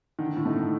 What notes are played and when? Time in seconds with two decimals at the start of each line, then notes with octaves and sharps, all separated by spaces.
0.19 D3 D#3
0.36 A2
0.45 A3 D#4
0.53 A2